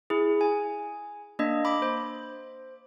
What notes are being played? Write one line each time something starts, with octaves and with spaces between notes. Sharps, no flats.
E4 G#4
G#5
A#3 D4 D#5
B5 D6
C5